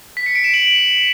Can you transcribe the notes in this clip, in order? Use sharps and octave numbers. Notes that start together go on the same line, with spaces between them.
B6
C#7
D7
E7
D7 F#7